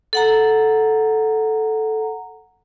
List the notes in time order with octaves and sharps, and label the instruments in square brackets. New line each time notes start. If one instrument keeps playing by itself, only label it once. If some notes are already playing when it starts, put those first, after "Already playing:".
[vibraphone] A4 F#5 A#5